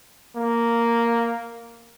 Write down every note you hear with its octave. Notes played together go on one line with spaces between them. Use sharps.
A#3